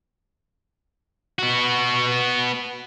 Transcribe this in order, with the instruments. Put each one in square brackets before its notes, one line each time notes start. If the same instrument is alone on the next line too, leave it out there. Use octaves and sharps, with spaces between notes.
[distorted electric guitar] B3 F#4